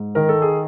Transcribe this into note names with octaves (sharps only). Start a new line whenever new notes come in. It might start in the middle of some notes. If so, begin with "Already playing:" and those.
Already playing: G#2
D#3 A#4
A4
G#4